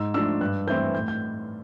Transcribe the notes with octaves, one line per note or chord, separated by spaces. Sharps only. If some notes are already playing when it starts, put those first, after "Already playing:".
Already playing: G#2 E6
F3 A3 D4 E6
G2 F#6
E3 A3 C4 E4 G6
A2 G6
G6